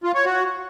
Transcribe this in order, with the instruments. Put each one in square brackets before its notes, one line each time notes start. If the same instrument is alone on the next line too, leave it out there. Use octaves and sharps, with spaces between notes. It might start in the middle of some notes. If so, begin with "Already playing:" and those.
[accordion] F4
C#5
F#4